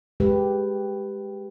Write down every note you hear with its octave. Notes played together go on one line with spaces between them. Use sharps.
G#3 G4 B4